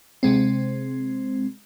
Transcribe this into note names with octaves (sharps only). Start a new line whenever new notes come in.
C3 G#3 C4